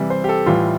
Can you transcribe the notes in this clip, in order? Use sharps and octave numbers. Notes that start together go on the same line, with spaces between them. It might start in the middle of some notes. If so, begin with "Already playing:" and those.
Already playing: C3 E3 G3
C5
G4
A4
A2 E3 G3 F4